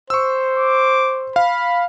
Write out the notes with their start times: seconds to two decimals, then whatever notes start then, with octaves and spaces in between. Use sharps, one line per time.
0.10 C5 C#6 E6
0.57 D6
1.36 F5 B5